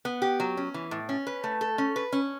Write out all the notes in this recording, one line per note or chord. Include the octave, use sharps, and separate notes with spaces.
B3
G4
F#3
C#4
E3
A2
C#4
B4
A3
A4
C#4
B4
C#4